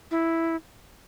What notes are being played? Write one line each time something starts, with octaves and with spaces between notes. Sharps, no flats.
E4